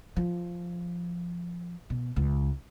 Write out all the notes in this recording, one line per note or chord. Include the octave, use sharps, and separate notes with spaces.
F3
B2
C#2